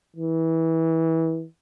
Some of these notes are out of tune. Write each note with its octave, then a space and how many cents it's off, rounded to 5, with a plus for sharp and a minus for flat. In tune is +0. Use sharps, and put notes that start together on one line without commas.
E3 -20